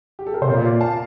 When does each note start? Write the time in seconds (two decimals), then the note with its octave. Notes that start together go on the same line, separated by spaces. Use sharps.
0.19 G4
0.27 A4
0.34 A#4
0.42 C3 C5
0.50 A#2 A#4 D5
0.65 D5 F5
0.81 F5 A5